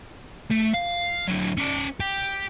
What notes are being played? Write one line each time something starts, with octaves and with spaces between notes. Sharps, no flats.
A3
F5
D3 F#3
C#4 D5
G4